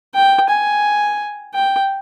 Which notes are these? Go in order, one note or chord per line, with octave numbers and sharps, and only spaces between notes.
G5
G#5
G5